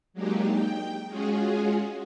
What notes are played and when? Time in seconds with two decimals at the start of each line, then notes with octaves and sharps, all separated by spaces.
0.13 F#3 G#3 A#3 D4 D#4 G4
0.50 G5
1.07 G#3 C#4 F4 F#4 G#4